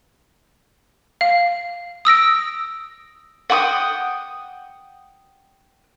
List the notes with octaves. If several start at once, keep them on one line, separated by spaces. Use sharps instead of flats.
F5
D#6 E6 A#6 D7
F#5 G5 D6 D#6